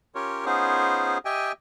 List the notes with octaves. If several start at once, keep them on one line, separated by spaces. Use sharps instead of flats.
C#4 F4 G4 A#4 C#5
B3 C#4 D#4 F4 G#4 C5
G4 D#5 E5 G5 G#5